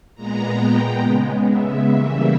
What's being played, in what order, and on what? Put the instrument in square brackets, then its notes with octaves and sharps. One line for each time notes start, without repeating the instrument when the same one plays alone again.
[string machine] A#2 G#3 B3 A#5
G5
C#3 G#3 B3
E5
C#3 E3 G3 A#3